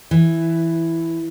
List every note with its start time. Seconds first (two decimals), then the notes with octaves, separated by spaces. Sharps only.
0.11 E3